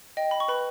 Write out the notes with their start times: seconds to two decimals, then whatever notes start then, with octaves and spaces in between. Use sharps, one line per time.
0.17 D#5 G5
0.31 B5
0.40 C#6
0.48 B4 B5